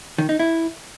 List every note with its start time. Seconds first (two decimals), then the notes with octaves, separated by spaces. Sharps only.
0.18 D#3
0.29 D#4
0.39 E4